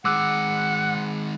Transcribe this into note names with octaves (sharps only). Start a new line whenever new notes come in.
D#3 G#3 F#5 D6 E6 F#6